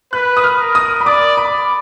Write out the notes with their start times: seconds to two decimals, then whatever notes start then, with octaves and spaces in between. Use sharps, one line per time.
0.13 B4 F#6
0.37 D#6
0.44 F6
0.59 A#4
0.75 D#6
1.01 B5
1.06 D5 D6
1.37 B5